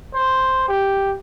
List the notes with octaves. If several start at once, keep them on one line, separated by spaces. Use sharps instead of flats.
C5
G4